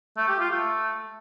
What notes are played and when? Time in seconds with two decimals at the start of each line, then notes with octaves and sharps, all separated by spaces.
0.17 A3
0.28 G4
0.40 F4
0.51 A3